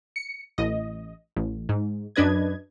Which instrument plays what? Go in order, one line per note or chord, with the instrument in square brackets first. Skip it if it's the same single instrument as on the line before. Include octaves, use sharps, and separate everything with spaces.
[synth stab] C#7
A1 D#5
A1
G#2
F#2 D4 B4 D#5 G#6